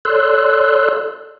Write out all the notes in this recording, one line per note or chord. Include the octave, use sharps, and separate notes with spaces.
A4 C#5 D5 C6 E6 F#6